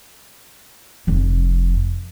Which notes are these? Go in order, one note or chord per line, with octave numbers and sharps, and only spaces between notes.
F1 F2